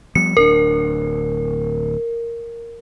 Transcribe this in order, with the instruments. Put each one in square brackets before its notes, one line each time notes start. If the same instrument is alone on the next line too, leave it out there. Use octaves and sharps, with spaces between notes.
[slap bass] F3 G3 B3 [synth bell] C#7
[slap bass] D1 C#4 D4 [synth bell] A#4